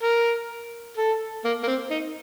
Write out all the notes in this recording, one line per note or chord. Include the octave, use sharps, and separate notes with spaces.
A#4
A4
A#3
A#3
C4
D#4